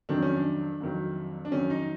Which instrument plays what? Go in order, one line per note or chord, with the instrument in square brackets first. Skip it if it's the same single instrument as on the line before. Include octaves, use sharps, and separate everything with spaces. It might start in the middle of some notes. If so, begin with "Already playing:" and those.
[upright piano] F2 C3 D#3 F#3 [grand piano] D4
[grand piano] C#4
D4
[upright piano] F2 C3 D#3 F#3
[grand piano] D4
[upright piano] F2 C3 D#3 F#3 [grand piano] C#4
[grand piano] D#4